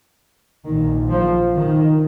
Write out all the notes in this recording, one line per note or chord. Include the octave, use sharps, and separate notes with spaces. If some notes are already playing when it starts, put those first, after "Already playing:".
A#1 A#2 D#3
F3
D#3